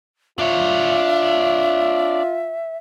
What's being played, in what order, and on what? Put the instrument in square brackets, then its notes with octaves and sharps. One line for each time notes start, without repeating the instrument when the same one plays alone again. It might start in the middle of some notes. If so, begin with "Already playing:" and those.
[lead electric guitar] D4 C#5 [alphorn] F4 [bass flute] E5